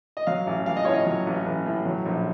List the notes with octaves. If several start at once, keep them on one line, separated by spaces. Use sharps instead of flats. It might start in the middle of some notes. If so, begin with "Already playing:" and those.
D#5
F#3 F5
A1
A1 F5
D#5
A2 C#5
D#5
F#3
A1
A1
A2
F#3
A#1